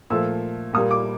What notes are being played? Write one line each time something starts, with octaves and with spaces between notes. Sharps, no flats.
A#2 F3 A3 E6
A#2 G3 A#3 D#6
D6